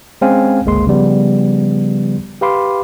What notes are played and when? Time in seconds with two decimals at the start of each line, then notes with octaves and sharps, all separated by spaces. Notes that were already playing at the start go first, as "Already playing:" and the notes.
0.22 G#3 C4 C#4 C5 F5 G#5
0.65 G1 C#2 G#3 A#3 C6
0.87 C#3 F3 G3 B3
2.41 G4 B4 F5 B5 C6 D6